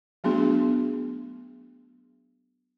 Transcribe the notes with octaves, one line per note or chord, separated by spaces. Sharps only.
F#3 A3 B3 D4 F#4 G#4